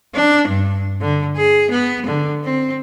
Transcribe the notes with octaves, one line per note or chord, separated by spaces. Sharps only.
D4
G2
D3
G#4
B3
D3
C4